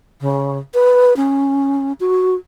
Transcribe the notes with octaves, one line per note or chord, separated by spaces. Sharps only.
C#3
B4
C#4
F#4